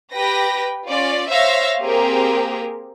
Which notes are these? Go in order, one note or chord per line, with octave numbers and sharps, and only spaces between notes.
G4 B4 G5 A#6
C#4 F4 D5
C5 C#5 E5 F5 A#6
A#3 C4 G4 G#4 A#4